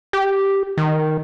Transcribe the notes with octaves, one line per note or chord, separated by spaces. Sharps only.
G4
D#3